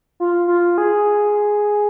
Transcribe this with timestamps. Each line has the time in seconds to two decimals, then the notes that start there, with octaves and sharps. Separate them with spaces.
0.20 F4
0.48 F4
0.78 G#4